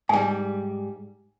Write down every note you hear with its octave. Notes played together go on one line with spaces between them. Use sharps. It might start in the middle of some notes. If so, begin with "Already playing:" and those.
G#2 G3 G#5